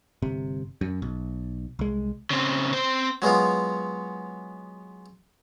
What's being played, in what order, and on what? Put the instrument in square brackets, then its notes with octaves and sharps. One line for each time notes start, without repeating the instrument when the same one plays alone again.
[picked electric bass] G1 C3
F#2
B1
C2 G#3
[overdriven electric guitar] C#3 C4
C4 C5
[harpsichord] F#3 G#3 B3 F4